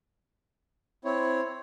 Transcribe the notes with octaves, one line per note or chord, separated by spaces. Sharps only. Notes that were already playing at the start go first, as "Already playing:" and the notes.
C4 E4 C#5